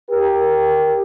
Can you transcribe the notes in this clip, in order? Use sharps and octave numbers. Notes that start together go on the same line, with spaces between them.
G4 A#4